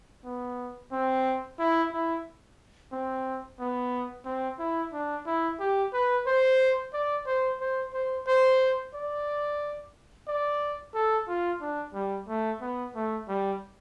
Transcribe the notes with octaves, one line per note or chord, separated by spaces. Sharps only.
B3
C4
E4
E4
C4
B3
C4
E4
D4
E4
G4
B4
C5
D5
C5
C5
C5
C5
D5
D5
A4
F4
D4
G3
A3
B3
A3
G3